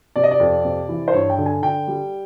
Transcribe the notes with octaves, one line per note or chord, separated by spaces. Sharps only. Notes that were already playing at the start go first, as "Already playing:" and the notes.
C3 D5
D#5
D5
F2
C3
E3
C5
G2 C#5
G5
D3
G#5
D3 G5
G3